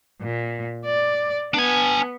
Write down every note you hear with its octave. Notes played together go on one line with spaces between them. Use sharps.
A#2
D5
B3 D4 G#5